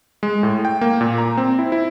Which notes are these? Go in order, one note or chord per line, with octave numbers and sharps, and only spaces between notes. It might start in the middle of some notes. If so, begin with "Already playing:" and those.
G#3
A2
G5
A#3
A#2
A#5
C4
E4
E4